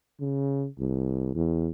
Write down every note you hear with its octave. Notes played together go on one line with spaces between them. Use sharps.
C#3
C2
E2